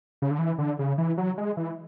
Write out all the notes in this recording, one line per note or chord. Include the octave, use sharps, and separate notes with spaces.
C#3
D3
E3
D3
C#3
E3
F#3
G#3
E3